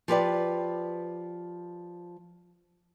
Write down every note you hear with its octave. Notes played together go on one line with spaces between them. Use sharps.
F3 G4 B4 D5